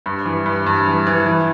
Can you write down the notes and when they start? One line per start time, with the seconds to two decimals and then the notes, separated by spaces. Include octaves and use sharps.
0.06 G2
0.26 E3
0.46 G2
0.66 G2
0.86 E3
1.07 E3
1.26 E3